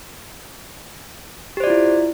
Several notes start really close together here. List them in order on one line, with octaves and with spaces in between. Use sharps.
G4 C5 D5 F4 E4